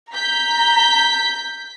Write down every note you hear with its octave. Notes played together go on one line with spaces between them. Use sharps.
A#5 G6 B6